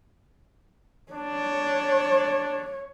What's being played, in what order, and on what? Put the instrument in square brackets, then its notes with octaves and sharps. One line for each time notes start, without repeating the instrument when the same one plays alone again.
[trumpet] D4 [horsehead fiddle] C#5